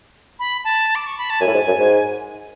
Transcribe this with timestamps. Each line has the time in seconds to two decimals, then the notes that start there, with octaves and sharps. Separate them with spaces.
0.39 B5
0.64 A5
0.95 D6
1.07 C#6
1.18 B5
1.30 A5
1.41 F#2 G#5
1.47 A2
1.54 G#2
1.67 F#2
1.79 G#2